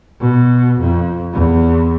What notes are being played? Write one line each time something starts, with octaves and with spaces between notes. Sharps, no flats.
B2
F2
E2